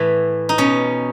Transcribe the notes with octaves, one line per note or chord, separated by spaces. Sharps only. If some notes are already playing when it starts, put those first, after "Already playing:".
Already playing: A2 E3
D#4
B2 C#4